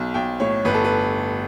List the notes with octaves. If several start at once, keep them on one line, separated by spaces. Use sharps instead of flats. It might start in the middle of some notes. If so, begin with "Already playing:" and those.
Already playing: B1
B1 G5
A2 C#5
G1 B4
A4
B4